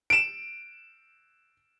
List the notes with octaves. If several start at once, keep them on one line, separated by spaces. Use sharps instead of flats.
D7 E7